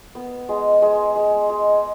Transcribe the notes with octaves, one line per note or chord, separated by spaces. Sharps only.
B3
G#3
G#3
G#3
G#3